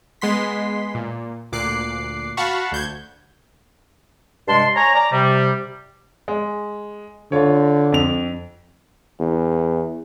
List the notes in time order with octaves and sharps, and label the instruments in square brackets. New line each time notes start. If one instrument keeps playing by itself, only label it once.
[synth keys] G#3 B3 C6 B6
A#2
D2 A#2 D6 F#6 C7
F#4 F5 F#5 A5 B5 C#6
D2 G6 G#6
[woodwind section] G2 C3 G#3 A5 C6
C#5 G#5 A#5
D5 A#5
C3 G3
[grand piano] G#3
[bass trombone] D3 [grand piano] F4 C#5
[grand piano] F2 F7
[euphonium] E2